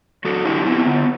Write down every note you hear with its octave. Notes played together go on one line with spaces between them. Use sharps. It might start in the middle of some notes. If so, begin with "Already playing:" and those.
F#2 F#4 A4
D3 E4 G4
B3 C4 E4
D3